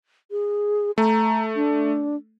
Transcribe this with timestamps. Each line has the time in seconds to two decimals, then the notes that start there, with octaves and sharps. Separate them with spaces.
0.31 G#4
0.98 A3 A#5
1.56 D4